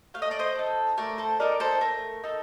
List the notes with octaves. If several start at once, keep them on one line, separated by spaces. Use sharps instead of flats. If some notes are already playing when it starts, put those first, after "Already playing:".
A3 F5
D#5
D5
C5 D#5
D#4 A4
A3 A#4 D5
A4 C5
D#4 A4 A#4 D5
A4 C5
A3 A#4
D#4 A4